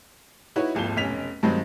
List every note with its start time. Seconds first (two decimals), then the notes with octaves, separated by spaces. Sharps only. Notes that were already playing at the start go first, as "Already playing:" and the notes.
0.56 D#4 E4 F#4 B4 C#5
0.75 D#1 G#1 F3 G7
0.96 F1 B1 C#4 B6 F7
1.43 G2 D#3 F#3 G#3 C4 D#4